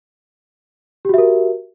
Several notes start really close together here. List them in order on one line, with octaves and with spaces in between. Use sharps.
G4 F#4 E5 A#4